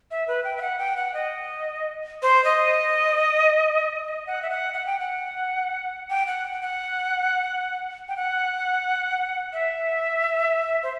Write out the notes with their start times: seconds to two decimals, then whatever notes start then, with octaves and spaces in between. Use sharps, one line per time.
0.11 E5
0.28 B4
0.44 G5
0.57 E5
0.61 F#5
0.79 G5
0.97 F#5
1.14 D#5
2.22 C5
2.45 D#5
4.05 D#5
4.27 F#5
4.42 E5
4.50 F#5
4.73 F#5
4.86 G5
4.99 F#5
6.10 G5
6.27 F#5
6.62 F#5
8.09 G5
8.16 F#5
9.53 E5
10.83 C5